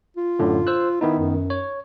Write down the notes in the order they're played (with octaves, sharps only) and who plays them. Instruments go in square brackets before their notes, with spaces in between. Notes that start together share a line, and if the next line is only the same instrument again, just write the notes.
[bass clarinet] F4
[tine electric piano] F#2 A2 D3
C5 E6 F#6
[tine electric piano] D#3 B3 D#4 [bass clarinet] E4
[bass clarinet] F#2
[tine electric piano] C#5